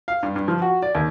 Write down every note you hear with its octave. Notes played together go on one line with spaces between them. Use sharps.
F5
G2
G2
F3
F#4
D5
D#2